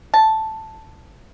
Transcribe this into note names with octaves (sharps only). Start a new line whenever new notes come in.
A5